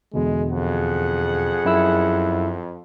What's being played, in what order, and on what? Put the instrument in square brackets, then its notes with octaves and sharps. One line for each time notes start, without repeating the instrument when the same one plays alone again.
[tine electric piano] E2 B2 D3 [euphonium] G#3
[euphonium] F2 [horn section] G#4 F#5
[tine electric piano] F#2 E4 E6